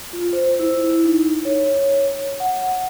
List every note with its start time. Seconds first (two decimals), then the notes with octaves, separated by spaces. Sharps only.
0.13 F4
0.33 C5
0.59 E4
1.05 D#4
1.45 C#5
2.40 F#5